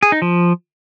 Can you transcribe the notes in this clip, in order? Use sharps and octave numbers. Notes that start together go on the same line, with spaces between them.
G#4
D#4
F3